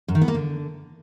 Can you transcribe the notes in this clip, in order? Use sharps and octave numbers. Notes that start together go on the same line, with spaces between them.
F#2
D#3
B3
A#3
D3